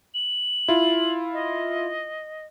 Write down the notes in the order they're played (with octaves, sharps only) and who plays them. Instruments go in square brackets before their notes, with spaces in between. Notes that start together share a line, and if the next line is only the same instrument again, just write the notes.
[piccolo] F#7
[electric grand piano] E4 F4
[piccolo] D#5